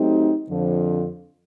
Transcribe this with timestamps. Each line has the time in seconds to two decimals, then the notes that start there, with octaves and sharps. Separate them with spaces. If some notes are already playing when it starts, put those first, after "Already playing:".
Already playing: F#3 A3 C4 D#4 G4
0.48 F2 D3 F3